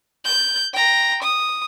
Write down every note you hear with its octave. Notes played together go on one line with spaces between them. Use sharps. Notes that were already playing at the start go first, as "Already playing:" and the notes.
G6
G5 A#5
D#6